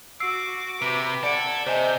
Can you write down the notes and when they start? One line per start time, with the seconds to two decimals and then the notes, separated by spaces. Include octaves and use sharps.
0.20 F#4 D6 E6 C7 D7
0.82 C3 B4 D6 D7
1.23 A4 D5 F#5 G#6 D7
1.66 C3 C5 D#5 G#5 G6